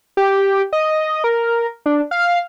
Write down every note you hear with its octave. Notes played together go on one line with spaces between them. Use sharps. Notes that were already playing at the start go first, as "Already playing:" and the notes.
G4
D#5
A#4
D4
F5